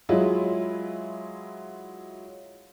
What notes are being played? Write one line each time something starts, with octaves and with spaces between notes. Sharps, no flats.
F#3 G#3 E4 F4